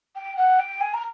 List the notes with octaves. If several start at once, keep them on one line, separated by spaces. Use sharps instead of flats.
G5
F#5
G5
G#5
A#5